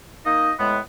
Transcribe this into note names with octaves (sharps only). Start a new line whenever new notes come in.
A#3 D#4 D#5
A2 G#3 B3